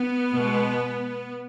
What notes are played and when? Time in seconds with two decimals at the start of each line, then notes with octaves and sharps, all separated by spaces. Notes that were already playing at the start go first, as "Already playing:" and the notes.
Already playing: B3
0.32 B2 G#3